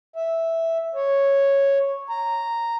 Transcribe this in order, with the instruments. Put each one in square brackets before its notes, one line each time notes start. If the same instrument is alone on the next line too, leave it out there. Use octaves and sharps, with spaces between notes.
[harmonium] E5
C#5
A#5